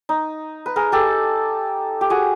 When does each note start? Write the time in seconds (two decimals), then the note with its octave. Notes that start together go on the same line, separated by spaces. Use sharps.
0.09 D#4
0.66 B4
0.76 G#4 A#4
0.92 G4 A4
2.01 G4
2.10 F#4 G#4